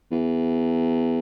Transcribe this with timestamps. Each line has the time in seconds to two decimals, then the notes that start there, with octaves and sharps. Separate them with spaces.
0.11 E2